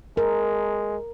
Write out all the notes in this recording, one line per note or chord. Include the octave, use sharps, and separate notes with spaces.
G#3 A#4